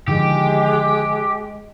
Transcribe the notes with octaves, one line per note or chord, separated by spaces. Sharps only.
D3 D#3 F3 G#3 G4